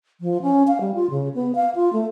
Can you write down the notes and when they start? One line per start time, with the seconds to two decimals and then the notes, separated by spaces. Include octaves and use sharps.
0.21 F3
0.42 C#4
0.68 F5
0.81 G3
0.95 F4
1.11 C#3
1.34 B3
1.55 F5
1.75 F4
1.93 A3